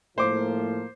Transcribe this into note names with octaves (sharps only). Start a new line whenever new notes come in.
A2 F3 A#3 C5 D6